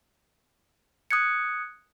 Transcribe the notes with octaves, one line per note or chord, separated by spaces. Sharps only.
D#6 F#6 G#6 C#7